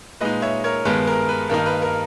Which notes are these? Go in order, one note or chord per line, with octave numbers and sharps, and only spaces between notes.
A#2 G#3 D#4 B4 D#5
C#5 E5
A#4 C#5
G2 D#3 G#3 B3 B4
A#4
B4
G2 D#3 A#3 D#4 A#4
B4
A#4